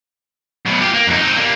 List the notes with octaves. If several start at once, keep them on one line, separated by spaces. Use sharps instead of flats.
F#2 B2
F4 G4
A#3
F2 D#4
C4 D#4
G3 A#3